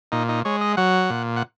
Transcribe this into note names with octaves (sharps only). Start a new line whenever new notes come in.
A#2 D#4
D#4
G#3 C#5
D#5
F#3 F#5
A#2
F#5